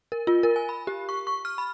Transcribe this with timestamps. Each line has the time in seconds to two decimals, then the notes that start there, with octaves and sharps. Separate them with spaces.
0.12 A#4
0.27 F4
0.43 A#4
0.56 G#5
0.69 B5
0.87 G4
1.09 C#6
1.27 C#6
1.45 F6
1.58 B5